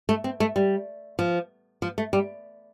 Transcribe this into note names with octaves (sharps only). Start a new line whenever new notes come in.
A3
C4
A3
G3
F3
F3
A3
G3